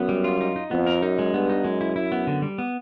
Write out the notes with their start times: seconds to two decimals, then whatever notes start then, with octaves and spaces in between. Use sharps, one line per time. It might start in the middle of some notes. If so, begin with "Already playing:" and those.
Already playing: F#2 B3
0.09 G3
0.24 F4
0.41 D#4
0.56 D#4
0.71 F2 B3
0.87 A#4
1.02 F#2 D#4
1.19 G#3
1.33 G2 B3
1.49 D#4
1.64 F#2 G#3
1.81 E4
1.96 E4
2.12 B3
2.27 D3
2.42 G3
2.58 B3